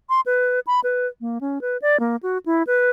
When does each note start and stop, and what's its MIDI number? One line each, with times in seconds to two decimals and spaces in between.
0.09 0.21 84
0.26 0.60 71
0.67 0.80 83
0.84 1.07 71
1.21 1.38 58
1.41 1.61 61
1.61 1.77 71
1.82 2.00 74
2.00 2.16 58
2.23 2.38 66
2.46 2.63 64
2.67 2.90 71